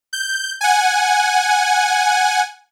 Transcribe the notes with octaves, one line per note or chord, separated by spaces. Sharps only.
G6
F#5 G#5